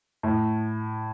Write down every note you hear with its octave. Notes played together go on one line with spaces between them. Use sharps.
A2